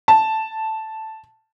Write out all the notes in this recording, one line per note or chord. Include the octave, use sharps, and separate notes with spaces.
A5